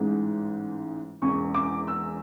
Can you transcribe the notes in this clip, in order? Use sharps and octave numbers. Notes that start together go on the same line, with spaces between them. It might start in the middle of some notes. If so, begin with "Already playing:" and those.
Already playing: A1 G#2 E3 G#3
E1 E2 C#3 C#6
D6
E6